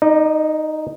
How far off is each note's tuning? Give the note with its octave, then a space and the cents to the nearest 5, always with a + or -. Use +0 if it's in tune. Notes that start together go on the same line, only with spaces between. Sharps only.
D#4 +0 D5 +40